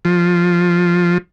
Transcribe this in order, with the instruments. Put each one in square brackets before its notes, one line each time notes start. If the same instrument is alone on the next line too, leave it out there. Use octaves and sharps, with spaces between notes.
[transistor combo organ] F3